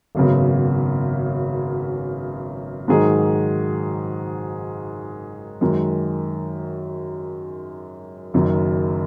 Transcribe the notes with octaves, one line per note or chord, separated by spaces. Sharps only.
G#1 F#2 C#3 B3
G#2 D#3 F#3 D#4 G#4
F#2 D#3 G#3
F#1 F#2 D#3